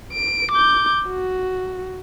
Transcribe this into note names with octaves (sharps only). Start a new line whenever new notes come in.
D7
D6 G6
F#4